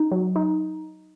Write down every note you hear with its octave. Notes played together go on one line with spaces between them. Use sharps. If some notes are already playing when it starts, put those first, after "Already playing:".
Already playing: D#4
F#3
D#4